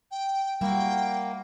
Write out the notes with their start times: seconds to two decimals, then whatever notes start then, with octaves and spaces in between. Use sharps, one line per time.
0.11 G5
0.61 G3 A#3 E4 F#4 G5